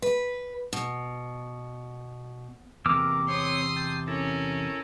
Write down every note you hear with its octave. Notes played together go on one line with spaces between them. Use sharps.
B4
B2
E2 C3 A#3 D6 E6 F6
C4 C#5 C6 D#6
G5 A5
C#4 E4 A4 A#4